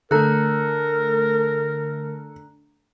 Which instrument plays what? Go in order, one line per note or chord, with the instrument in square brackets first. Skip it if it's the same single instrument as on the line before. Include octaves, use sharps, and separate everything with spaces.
[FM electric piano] D3 A3 [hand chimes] D4 A#5 F#6 [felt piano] A4 [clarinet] A#4